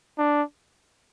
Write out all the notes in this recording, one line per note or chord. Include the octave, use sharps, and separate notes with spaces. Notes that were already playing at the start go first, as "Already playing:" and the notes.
D4